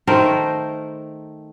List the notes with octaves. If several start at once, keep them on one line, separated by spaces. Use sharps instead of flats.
D#3 A3 A#4 C5